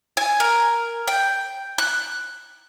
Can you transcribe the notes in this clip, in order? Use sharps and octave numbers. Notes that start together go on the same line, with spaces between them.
G#5
A#4
G5
F#6